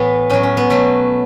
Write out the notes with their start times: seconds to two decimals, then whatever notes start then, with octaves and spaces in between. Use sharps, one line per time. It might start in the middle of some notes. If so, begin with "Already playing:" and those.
Already playing: A2 E3 B3
0.30 A2 F#3 C#4
0.43 C#4
0.57 B3
0.70 B2 F#3 A3